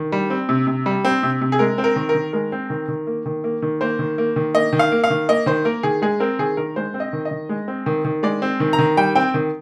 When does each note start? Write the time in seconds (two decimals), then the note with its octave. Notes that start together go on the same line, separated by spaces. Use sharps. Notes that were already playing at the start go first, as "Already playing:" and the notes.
Already playing: D#3
0.12 G3
0.30 C4
0.49 C3
0.67 C3
0.86 G3
1.05 C4
1.23 C3
1.42 C3
1.52 G#4
1.59 G#3 A#4
1.78 C4
1.84 A#4
1.96 D#3
2.09 A#4
2.15 D#3
2.33 G#3 A#4
2.52 C4
2.70 D#3
2.88 D#3
3.07 A#3
3.26 D#3
3.44 A#3
3.62 D#3
3.81 A#3 C5
3.99 D#3
4.18 A#3
4.36 D#3
4.55 A#3 D#5
4.73 D#3
4.79 F5
4.92 A#3
5.04 F5
5.10 D#3
5.29 A#3 D#5
5.46 D#3 C5
5.65 A#3 A#4
5.83 D#3 G#4
6.02 G#3 G#4
6.20 C4 A#4
6.39 D#3 G#4
6.57 D#3 A#4
6.76 G#3 C5
6.94 C4
7.00 D#5
7.13 D#3
7.25 D#5
7.31 D#3
7.49 G#3
7.68 C4
7.86 D#3
8.05 D#3
8.23 G#3 D5
8.42 C4
8.60 D#3
8.73 A#5
8.79 D#3
8.97 G3 G5
9.15 C4 G5
9.34 D#3